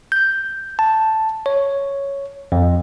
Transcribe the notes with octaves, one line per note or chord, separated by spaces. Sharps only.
G6
A5
C#5
F2